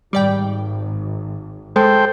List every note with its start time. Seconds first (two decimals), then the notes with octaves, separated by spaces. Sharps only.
0.13 G#1 G3 D5 G5
1.76 G#3 A4 C5 G5